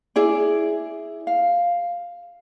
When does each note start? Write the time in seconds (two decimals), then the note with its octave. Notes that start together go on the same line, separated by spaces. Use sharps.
0.16 E4 G#4 D5
1.27 F5